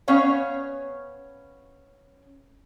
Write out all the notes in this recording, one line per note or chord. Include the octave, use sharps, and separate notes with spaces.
B3 C#4 C#5 F5